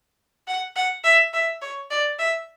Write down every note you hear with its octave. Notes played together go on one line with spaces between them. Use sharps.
F#5
F#5
E5
E5
C#5
D5
E5